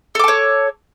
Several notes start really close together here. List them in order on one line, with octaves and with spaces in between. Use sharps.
A4 D6 A5 C#5